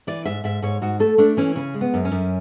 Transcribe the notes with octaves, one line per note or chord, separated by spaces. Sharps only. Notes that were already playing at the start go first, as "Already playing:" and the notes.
E3 D5
G#2 E5
G#2 E5
G#2 C#5
G#2 F#4
A3 A4
A3 D4
E3 C#4
C#3 C#4
G#3
B3
F#2
C#4
F#2